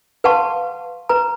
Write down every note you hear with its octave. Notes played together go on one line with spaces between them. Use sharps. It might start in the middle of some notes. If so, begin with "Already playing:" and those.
B4 F5 F#5 A5 C6 C#6
B4 A#5